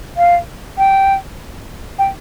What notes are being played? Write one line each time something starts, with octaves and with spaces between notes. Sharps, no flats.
F5
G5
G5